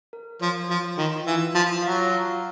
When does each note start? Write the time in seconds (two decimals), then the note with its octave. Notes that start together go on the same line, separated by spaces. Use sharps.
0.13 A#4
0.41 F3 C#5
0.69 F3 F4
0.98 D#3 F4
1.26 E3 F5
1.54 F3 F4
1.82 F#3 F5
2.11 F5